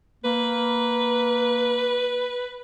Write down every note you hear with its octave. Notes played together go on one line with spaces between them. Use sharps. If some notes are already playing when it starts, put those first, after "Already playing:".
A#3 B4